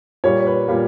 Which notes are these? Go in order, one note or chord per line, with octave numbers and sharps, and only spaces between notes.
A#2 G3 A#3 C#5
B4
A#2 G3 A#3